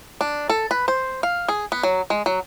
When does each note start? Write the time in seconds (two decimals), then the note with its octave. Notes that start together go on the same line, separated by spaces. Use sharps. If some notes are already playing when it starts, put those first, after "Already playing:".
0.21 D4
0.50 A4
0.71 B4
0.88 C5
1.23 F5
1.49 G#4
1.72 B3
1.83 F#3
2.10 G#3
2.26 F#3